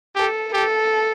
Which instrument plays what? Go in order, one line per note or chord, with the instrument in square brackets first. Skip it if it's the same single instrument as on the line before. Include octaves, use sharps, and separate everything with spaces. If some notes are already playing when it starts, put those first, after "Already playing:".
[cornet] G4 [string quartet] A4
[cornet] G4 [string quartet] A4